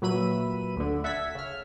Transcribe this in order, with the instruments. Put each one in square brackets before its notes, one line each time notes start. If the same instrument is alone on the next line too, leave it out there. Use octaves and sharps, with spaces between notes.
[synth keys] A#2 F#3 B4 E5 B5 D#7
D2 D3
E5 F#5 A5 E6 G#6 B6
C#3 F6